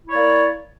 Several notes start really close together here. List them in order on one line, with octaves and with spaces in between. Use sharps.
E4 C#5 D5 A#3